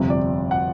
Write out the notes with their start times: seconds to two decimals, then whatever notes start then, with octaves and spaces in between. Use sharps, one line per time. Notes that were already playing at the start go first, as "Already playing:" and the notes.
Already playing: G1 F2 C3
0.10 D5
0.51 F#5